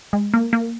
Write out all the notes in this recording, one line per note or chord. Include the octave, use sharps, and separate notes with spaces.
G#3
A#3
A#3